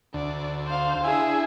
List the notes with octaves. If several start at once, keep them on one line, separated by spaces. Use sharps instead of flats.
D2 D5
C5 F5
D4 E4 G#4